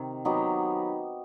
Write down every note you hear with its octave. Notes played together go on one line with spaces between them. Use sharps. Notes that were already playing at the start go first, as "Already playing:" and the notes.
Already playing: C3 D#3
F#3 B3 D#4 G4